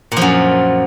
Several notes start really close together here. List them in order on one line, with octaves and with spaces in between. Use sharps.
A#2 F3 F#2